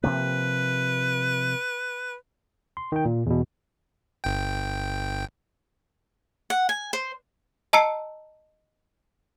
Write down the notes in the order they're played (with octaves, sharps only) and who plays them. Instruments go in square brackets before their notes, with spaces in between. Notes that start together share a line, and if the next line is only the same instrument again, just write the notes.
[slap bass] C3 F3 A#3 [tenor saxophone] B4
[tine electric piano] C6
D#3 G5
A#2
E2 B2
[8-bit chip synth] G1 G5
[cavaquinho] F#5
G#5
C5
[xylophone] D#5 A5 A#5 E6 C7 C#7